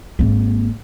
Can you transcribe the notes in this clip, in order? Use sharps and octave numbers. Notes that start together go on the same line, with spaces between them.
G#1 A#3